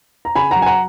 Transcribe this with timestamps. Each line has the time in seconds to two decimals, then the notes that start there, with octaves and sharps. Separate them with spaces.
0.25 A#5
0.35 C#3 G#5 B5
0.51 F#3 F#5 A#5
0.62 G#5
0.66 F#5 A#5